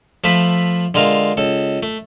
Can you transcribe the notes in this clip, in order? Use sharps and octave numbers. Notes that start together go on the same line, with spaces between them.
F3 A3 F4 E5 B5
D3 G#3 F4 A#4 F5
C#2 A4
A3